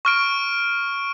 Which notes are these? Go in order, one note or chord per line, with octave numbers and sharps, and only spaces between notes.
C#6 F6 D7